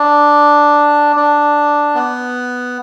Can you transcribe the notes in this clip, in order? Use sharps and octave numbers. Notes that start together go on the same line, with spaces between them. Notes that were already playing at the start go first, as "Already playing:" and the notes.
Already playing: D4
D4
B3